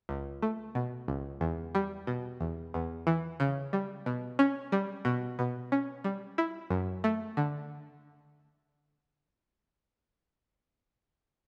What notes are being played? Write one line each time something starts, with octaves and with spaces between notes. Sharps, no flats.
C#2
A3
B2
C#2
E2
G3
B2
E2
E2
E3
C#3
G3
B2
C#4
G3
B2
B2
C#4
G3
E4
F#2
A3
D3